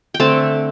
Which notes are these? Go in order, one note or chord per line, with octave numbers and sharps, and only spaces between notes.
G5
D3 A3 C4 A5